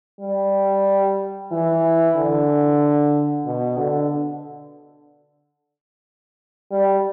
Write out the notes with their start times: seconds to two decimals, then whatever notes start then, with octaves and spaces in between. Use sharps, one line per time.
0.21 G3
1.52 E3
2.16 D3
3.46 B2
3.78 D3
6.72 G3